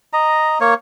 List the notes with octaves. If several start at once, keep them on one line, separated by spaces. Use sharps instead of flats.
D#5 A#5
A#3 C#5